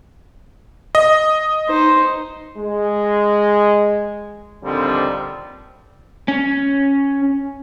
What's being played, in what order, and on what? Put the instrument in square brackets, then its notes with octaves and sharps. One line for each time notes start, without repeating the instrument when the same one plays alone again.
[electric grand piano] D#5
[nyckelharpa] D#4 C5
[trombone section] G#3
D#2 A#2 D3 F3 G3 C4
[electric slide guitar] C#4